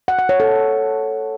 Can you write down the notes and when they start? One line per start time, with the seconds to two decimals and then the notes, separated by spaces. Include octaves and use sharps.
0.08 F#5
0.19 F#5
0.29 C#5
0.40 A4